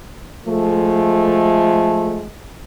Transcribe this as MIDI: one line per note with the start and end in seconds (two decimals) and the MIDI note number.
0.46 2.25 53
0.46 2.25 56
0.46 2.25 57